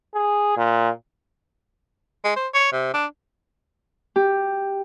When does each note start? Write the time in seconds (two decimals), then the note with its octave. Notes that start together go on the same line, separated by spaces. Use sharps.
0.14 G#4
0.57 A#2
2.24 G#3
2.36 C5
2.54 C#5
2.72 C3
2.94 D4
4.16 G4